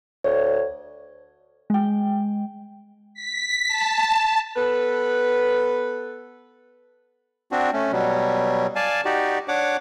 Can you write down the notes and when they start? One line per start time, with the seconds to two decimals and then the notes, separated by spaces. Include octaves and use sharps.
0.24 D2 C#5
1.70 G#3 G5
3.14 B6
3.68 A5
4.56 B3 A4 B4
7.52 C4 D4 F#4
7.73 A3 C#4
7.92 B2 F#3 G3
8.76 D5 F5 G#5 A5
9.05 D#4 F#4 G4 D5
9.48 D4 C#5 F#5 D6